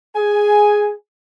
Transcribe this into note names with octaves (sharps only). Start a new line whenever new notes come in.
G#4 G#5